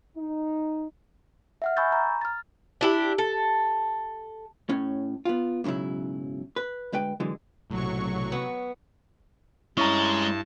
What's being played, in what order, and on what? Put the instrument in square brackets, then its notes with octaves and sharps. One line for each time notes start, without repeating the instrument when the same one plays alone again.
[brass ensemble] D#4
[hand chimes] E5 F#5 F6
G#5 B5 C#6 E6 G6 A6
A#5
F6 A6
[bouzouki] D4 E4 G4
A4
[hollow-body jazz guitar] A2 C#4
B3 F4
B1 G#2 C#3 F#3 E4
B4
D2 G#3 B4 G5
D3 E3 F#3 G#3
[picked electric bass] B1 A2 [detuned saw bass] C3 [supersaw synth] F#3 C#6
[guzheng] B3
[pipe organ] G2 A5 [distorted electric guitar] G#3 D#5 [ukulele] C#4 A#5 [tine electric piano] E4